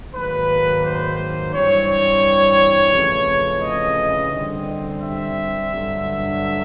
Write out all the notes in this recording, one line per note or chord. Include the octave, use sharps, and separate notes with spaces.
G#2 D#3 F#3 A#3 B4
C5
G2 E3 G3 C4 C#5
F2 C#3 E3 A3
D#5
D3 G3 C4
E5
G2 D3 F#3